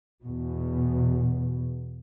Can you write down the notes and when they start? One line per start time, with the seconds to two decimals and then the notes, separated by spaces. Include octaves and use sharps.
0.23 E2 B2